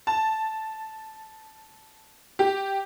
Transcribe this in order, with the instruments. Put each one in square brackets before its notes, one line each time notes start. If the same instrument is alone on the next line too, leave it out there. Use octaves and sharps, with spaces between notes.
[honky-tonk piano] A5
G4